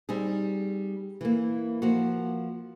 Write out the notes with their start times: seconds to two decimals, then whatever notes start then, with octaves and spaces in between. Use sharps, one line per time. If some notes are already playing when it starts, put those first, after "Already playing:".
0.09 G3 C4 D#4 G#4
1.21 E3 A#3
1.82 F3 A#3 F#4